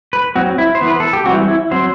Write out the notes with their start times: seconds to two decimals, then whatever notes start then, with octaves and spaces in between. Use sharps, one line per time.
0.13 B4
0.36 F#3 C4 F#4
0.58 E4
0.75 C5
0.81 E3 B3
0.88 B4
1.00 A4
1.13 G4
1.26 E3 G3 C4 F#4
1.48 E4
1.71 F#3 C4 C5